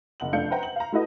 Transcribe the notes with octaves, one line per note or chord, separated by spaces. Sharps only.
F#1 F#5 F#7
F1 A3 D4 F5 G6 C#7
B4 C5 E5 F#5 G5 A#5
F#7
F5 A#5
A3 E4 F#4 A4 B4 D#5